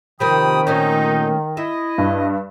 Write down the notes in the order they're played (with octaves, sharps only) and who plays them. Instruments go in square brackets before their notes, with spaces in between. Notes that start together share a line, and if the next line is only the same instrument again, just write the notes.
[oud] C3 F3 A#3 [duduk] D#3 [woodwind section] G5 B5 D#6
[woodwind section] A#2 D#4 [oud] A3 A#3 C#4
[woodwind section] E4 D#5 [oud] E5
[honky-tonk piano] G2